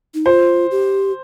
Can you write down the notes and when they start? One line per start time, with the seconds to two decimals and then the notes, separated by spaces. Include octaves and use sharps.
0.14 D#4
0.26 F4 C5
0.71 G4